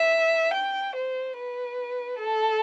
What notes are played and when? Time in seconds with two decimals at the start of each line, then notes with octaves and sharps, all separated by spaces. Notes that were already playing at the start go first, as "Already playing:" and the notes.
Already playing: E5
0.53 G5
0.95 C5
1.38 B4
2.21 A4